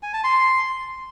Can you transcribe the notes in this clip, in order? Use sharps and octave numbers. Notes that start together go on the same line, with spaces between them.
G#5
A5
C6